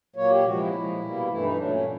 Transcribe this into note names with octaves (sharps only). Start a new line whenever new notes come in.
A#2 F#3 A#3 C#5
G4
C3 F3 G#3 F#4
E4
A#2 F3 G#3
B2 G3 A#3
G2 E3 A3 E4
D#4
A#2 F#3 A3 D4
C#4